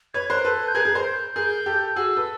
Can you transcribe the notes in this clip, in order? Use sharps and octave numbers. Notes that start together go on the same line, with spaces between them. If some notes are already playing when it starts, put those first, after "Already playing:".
B4 C#5 G#6
A#4 C5 F#6
A4 B4 F#6
G6
G#4 A#4 G#6
G#4 A#4
A#4 C5
G6
G#4 A#4 G6
G4 A4
F#4 G#4 E6
A4 B4